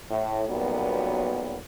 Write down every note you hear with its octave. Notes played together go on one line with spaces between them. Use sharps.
A2
B1 F#2 A#2 F#3 G3 B3